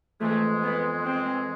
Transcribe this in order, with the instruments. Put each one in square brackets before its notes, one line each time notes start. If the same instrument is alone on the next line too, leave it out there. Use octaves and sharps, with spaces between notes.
[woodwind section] F2 E3 G#3 [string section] A3
[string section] B3
C4